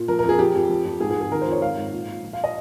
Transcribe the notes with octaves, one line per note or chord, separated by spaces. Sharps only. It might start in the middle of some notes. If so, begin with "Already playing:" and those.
Already playing: A#2
F3 A#4
A#4
F2 G#4
F3 G4
F2
F3
F2
G#2 G#4
G#4
G#2
G#4
D#3 A#4
C5
F2
C#5
G#2 F5
G#2
A#2
A#2
F3
F5
D#5